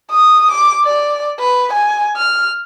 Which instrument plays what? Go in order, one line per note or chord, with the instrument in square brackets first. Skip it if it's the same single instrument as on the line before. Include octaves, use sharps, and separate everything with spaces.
[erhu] D#6
D6
D5
B4
G#5
F6